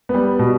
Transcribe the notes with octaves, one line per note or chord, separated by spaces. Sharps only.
G3 B3
B2